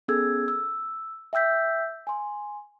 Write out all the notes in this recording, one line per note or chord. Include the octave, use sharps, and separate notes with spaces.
B3 C#4 G#4 A4 E6 G#6
E6
E5 G5 E6 G6 B6
G#5 C6